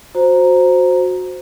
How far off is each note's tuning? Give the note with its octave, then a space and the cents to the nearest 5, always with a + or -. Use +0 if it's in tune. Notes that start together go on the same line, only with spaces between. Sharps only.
F#4 -15 C5 +0 A#5 +0